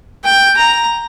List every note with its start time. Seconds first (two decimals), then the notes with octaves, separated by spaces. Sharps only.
0.25 G5
0.57 A#5